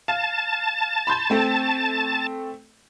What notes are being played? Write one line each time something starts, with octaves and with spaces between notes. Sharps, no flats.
F5 A5
B5 C6 G6
A3 C4 A4